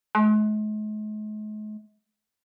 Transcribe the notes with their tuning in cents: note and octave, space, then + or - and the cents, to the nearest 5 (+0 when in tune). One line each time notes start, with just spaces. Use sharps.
G#3 +45